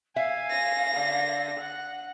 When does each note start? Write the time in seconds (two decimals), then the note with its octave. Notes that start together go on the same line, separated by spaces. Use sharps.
0.16 E5 F5 G#5
0.51 A#6
0.94 D3
1.59 F#5